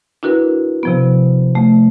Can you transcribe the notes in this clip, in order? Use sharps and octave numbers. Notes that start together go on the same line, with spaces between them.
D4 E4 F#4 A#4 B4
C3 F3 B3
A3